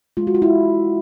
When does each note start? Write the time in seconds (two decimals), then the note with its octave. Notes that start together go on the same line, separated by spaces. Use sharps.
0.17 G#3 F4
0.27 F#4
0.35 F4
0.42 E4